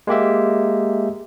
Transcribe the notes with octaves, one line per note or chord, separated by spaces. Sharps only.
G#3 A#3 G4 E5